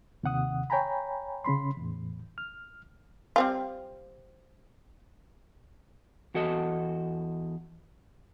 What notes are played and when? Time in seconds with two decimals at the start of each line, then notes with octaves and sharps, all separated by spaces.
0.23 D#2 C3 F#5 D#6
0.70 C#5 G5 G#5 A#5 B5
1.44 C#3 C#4 B5 C6
1.77 E2 A2
2.38 F6
3.36 G3 C4 F4
6.34 E2 F#4 A4 D#5